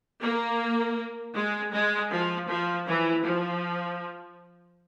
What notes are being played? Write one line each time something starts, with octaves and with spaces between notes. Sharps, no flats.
A#3
G#3
G#3
F3
F3
E3
F3